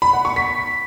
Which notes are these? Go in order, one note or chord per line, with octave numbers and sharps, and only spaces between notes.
B5
F#5
C#6
B6